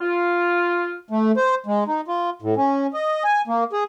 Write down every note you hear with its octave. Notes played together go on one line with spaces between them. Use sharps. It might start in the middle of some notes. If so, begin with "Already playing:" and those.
F4
A3
C5
G#3
D#4
F4
A2
C#4
D#5
G#5
A#3
G#4